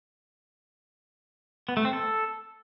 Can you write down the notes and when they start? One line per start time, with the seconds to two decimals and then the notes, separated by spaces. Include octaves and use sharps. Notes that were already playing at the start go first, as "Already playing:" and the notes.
1.69 B3
1.77 A3
1.85 C4
1.93 A4